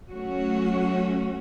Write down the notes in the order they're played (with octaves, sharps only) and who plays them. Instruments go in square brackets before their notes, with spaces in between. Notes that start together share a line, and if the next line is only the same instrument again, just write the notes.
[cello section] F#3 A3 C#4 F#4